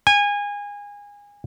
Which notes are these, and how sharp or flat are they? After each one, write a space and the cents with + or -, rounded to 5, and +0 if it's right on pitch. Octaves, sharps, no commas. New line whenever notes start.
G#5 -25